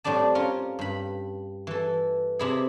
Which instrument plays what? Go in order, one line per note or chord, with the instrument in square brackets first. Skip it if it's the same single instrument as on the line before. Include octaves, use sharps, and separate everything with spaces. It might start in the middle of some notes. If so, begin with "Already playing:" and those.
[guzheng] A2 G3 C4 D4 A5
C#4 F4 A#4
G2 B5
E3 A4
C3 E4 G#4